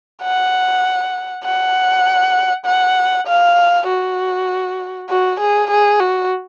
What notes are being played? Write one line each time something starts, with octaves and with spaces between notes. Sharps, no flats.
F#5
F#5
F#5
F5
F#4
F#4
G#4
G#4
F#4